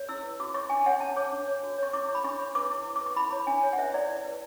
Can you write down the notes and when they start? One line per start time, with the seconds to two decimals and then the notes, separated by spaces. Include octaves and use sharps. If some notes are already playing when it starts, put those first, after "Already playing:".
Already playing: C#5
0.09 E4 E6
0.23 B4
0.39 F#4 D6
0.54 C#5 C#6
0.70 D4 G#5
0.86 C#5 F#5
1.00 D4 A5
1.16 C#5 D6
1.32 D4
1.47 C#5
1.63 F#4
1.78 C#5 C#6
1.93 E4 D6
2.09 C#5
2.15 B5
2.24 D4 C#6
2.39 C#5
2.55 B4 D6
2.70 E4
2.85 E4
2.96 D6
3.01 B4
3.06 C#6
3.16 E4 B5
3.32 C#5
3.47 D4 G#5
3.63 C#5
3.73 F#5
3.79 B4 E5
3.93 E4 D5
4.09 E4
4.25 B4